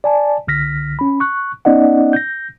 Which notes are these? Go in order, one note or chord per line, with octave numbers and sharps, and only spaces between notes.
D5 G#5 A5
C2 D3 F6 A#6 B6
C#4 B5
C#6 F#6
B3 C#4 D#4 D5 D#5 F#5
G6 A#6